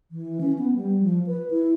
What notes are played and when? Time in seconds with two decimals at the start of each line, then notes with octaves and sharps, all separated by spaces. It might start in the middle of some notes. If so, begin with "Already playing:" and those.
0.11 E3
0.41 C#4
0.58 B3
0.76 G3
1.03 F3
1.27 B4
1.51 E4